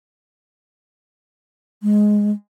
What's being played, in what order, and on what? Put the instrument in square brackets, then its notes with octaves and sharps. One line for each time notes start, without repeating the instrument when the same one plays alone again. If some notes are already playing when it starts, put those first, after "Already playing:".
[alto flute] G#3